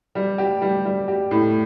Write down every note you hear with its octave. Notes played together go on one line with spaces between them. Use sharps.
G3
G4
G3
G3
G4
A2